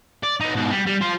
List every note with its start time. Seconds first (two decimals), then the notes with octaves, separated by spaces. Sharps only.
0.23 D5
0.40 B3 D#4
0.55 G#2 B2
0.71 G3
0.86 G3
1.01 F4 C5